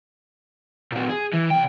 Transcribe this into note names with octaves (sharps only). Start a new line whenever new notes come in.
A#2 F#3
G#4
E3
C2 G5